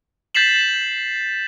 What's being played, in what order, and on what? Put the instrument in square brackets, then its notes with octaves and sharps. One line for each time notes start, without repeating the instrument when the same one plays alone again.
[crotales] G6 A6 B6 C7 E7 F#7